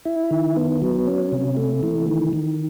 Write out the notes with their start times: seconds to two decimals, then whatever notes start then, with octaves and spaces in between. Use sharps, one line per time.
0.05 E4
0.31 D#3
0.56 B3
0.82 F#3
1.07 C#4
1.32 C3
1.57 A3
1.83 E3
2.08 D#3
2.33 D#3